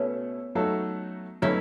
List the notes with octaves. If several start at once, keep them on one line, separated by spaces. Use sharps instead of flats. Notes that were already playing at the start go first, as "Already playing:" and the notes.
Already playing: B2 A3 B3 C#4 E4 A4
F#3 A3 D#4 F#4 A4
B2 F#3 A3 C#4 D#4 E4